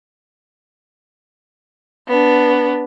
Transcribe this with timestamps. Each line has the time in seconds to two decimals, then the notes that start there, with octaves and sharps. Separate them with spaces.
2.08 B3 D4